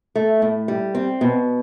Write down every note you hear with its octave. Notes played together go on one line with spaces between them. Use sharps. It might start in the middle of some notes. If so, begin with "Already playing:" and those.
A3
A2
G3
C4
B2